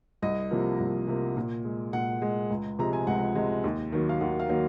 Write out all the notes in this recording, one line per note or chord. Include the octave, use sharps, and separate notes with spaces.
C2 D#5
C3 F3 A#3
C2
C3 F3 A#3
A#2
G#3
A#2 F#5
G#3
C#2
C3 F3 G#3 A#5
G#5
C#2 F#5
C3 F3 G#3
D#2
D#3 F#3 A#3
F5
D#2 F#5
F5
D#3 F#3 A#3